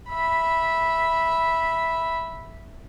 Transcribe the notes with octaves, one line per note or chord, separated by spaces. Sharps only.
E5 B5